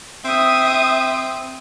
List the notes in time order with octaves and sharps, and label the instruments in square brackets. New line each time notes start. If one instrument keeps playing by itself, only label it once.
[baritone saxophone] C4 [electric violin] E5 D#6